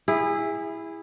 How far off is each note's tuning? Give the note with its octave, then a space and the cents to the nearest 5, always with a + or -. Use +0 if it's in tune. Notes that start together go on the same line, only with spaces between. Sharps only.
E4 +0 G#4 -25